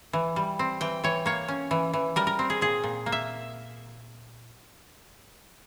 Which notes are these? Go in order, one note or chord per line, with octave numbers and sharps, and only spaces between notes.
E3
G3
C4
E3 G5
E3 C#5
A#3 C#5
C#4
E3
E3
G3 A#4
A#4
C4
G#4
A#2 G#4
A#2
A#3
E5